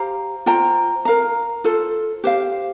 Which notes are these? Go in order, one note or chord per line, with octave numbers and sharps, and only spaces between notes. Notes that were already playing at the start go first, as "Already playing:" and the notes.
Already playing: G4 C5 F5 A#5
F4 C5 G5 A#5
A#4 F5 A#5
F4 A4 C5
G4 C5 F5